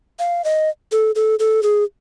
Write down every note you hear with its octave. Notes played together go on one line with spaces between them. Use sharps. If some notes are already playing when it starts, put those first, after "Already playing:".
F5
D#5
A4
A4
A4
G#4